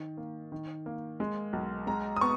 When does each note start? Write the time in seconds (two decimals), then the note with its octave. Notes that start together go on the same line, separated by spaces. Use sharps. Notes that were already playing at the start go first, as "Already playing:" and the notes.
Already playing: D#3
0.17 A#3
0.52 D#3
0.86 A#3
1.20 G#3
1.53 B1
1.87 G#3 A#5
2.16 D#6
2.21 B3 C#6